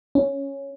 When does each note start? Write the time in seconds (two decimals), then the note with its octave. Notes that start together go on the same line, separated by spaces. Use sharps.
0.15 C#4